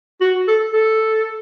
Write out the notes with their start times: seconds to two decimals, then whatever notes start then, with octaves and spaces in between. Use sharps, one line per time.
0.21 F#4
0.48 A4
0.74 A4